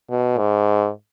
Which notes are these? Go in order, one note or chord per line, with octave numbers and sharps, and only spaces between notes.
B2
G#2